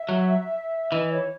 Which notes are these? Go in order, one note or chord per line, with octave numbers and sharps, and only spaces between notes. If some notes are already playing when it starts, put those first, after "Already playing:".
Already playing: E5
F#3
E3 D#5
C#5